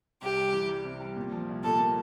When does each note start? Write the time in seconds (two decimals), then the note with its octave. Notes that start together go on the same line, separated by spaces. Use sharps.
0.21 C2 G4
0.37 G3
0.53 E3
0.69 G3
0.84 C3
1.00 G3
1.16 A#2
1.32 F3
1.48 C2
1.63 A#2 A4
1.80 A#3